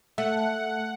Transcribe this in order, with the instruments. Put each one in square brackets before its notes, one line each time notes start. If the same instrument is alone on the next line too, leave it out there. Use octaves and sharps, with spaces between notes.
[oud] A3 [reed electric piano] E5 [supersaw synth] F#5